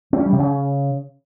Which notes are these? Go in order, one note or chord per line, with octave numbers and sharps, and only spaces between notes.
C4
C#4
G3
C3
C#3